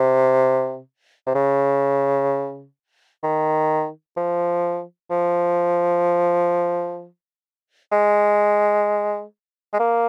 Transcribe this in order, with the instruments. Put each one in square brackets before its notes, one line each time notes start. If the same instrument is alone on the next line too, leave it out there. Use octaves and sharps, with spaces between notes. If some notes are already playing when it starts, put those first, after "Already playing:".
Already playing: [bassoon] C3
C3
C#3
D#3
F3
F3
G#3
G#3
A#3